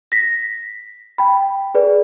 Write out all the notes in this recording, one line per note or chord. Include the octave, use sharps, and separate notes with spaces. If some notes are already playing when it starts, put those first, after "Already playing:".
A#6 B6
G5 B5
G#4 B4 D5